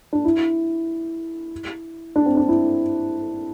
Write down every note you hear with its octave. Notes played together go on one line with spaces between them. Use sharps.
D4
E4
D4
C4
D4
E4